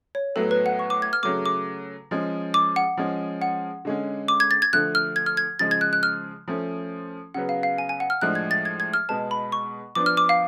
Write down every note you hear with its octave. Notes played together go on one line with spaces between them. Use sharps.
C#5
A2 F#3 B3 A4
B4
F#5
C#6
D6
G#6
F6
C#3 F#3 A3 D6
D6
F3 G#3 C#4
D6
F#5
F3 G#3 C#4
F#5
D3 G#3 C#4
D6
G#6
A6
G#6
D3 F3 A3 F#6
F6
G#6
F6
G#6
C#3 F3 G#3 A6
G#6
F#6
F#6
F6
F3 A3 C#4
C#3 F#3 B3 F#5
F5
F5
G#5
G#5
F#5
F6
A2 F3 G#3 D4 F#6
G#6
A6
G#6
G#6
F6
B2 G#3 B3 A5
B5
C#6
F3 B3 D4 D6
F6
D6
F5